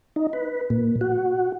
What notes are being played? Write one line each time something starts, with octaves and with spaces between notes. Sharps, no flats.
D#4
B4
A#2
F#4